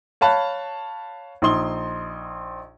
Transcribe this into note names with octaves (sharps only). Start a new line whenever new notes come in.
C#5 F5 A5 B5 F#6
A#1 D#4 C6 G7